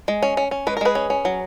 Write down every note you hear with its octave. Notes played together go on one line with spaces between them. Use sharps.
G#3
C#4
C#4
C#4
G#3 B4
A#4
G#3 G#4 B4
C#4
C#4
F#3